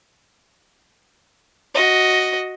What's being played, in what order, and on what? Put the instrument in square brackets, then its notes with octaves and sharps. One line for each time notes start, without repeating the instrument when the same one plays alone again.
[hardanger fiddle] F#4 D#5